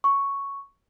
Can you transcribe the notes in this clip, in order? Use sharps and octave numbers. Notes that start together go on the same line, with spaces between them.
C#6